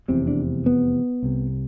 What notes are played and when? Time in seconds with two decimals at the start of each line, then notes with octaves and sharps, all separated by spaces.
0.08 F1 E2 C3 C4
0.28 D4
0.66 B3
1.23 C2 C3